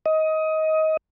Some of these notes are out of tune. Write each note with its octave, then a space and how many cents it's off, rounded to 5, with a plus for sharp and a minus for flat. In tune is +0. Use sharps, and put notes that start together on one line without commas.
D#5 +20